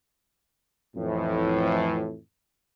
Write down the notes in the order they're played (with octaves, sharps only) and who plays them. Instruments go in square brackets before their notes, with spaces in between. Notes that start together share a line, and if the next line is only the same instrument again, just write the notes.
[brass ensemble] F2 A2 E3